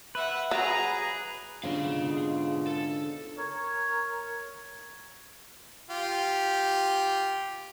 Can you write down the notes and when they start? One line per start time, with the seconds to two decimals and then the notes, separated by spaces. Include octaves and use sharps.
0.15 B4 E5 F#5
0.51 F#3 G#4 A#5
1.63 G#2 B2 D3 C#4 F4 G#4 F5
2.67 A4
3.38 A#4 C#5
5.90 F4 G4